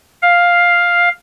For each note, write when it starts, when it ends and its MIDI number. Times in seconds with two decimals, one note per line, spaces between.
0.22 1.09 77